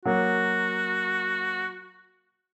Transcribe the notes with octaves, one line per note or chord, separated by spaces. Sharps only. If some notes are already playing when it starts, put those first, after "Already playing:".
F#3 A#3 F#4